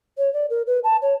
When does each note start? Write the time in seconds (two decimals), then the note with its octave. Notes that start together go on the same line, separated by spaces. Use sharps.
0.18 C#5
0.34 D5
0.50 A#4
0.67 B4
0.84 A5
1.02 C#5